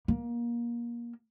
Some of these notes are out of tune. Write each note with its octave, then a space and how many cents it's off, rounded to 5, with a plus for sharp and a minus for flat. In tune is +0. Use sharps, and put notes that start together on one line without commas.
A#3 +25